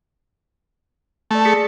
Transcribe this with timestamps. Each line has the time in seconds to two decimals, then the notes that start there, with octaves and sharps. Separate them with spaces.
1.31 A3 A4 D5
1.45 G#4 B6 C#7